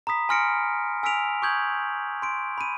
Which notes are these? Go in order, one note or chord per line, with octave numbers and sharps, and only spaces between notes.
A#5 B5 D#6 B6
G#5 C6 F6 A#6 C#7 D7
G#5 E6 F6 B6 D7 F7
C#6 D#6 G6 G#6 F#7
C6 D7
B5 D#7